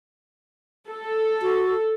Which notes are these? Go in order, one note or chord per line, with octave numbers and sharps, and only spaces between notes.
A4
F#4